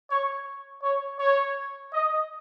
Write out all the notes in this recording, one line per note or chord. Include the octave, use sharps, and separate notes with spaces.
C#5
C#5
C#5
D#5